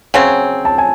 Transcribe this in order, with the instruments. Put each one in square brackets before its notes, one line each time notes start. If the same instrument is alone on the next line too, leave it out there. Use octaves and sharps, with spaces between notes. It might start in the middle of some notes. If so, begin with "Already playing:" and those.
[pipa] C#3 F#3 C4 [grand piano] G#5
[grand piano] A5
G#5